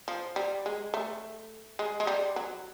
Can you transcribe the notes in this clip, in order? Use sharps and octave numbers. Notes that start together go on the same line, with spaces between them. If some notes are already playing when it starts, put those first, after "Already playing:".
F3
G3
G#3
A3
G#3
G#3
G3
F#3